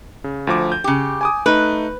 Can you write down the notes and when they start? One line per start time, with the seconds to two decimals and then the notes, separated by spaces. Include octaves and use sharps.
0.24 C#3
0.47 D2 F3 D6
0.72 G6
0.84 C#3 G4
1.21 G#5 D6 D#6
1.46 A3 D#4 B4